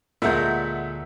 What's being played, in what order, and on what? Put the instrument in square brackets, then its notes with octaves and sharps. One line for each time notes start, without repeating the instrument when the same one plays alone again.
[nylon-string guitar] D2 A#4 [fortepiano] A#2 G#3 A3 [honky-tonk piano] E5 F#5 G6